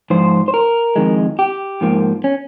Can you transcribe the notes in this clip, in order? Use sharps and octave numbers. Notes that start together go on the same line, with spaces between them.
G#2 F3 C5
C5
A#4
F2 D#3 G#3
G4
G#2 F3 A#3
C#4